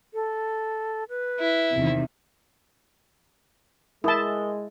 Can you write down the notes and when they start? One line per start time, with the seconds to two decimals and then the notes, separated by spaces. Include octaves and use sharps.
0.14 A4
1.09 B4
1.40 E4
1.73 E2 C3 D#3
4.04 G#3 E4 A#4 A5 D#6 G7